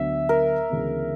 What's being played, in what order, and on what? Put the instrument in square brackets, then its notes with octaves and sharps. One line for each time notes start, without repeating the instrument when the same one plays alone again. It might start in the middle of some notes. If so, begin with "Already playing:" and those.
Already playing: [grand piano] D2 D3 F#3 B3 [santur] E5
[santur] A#4
[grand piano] D2 C#3 E3 G#3 B3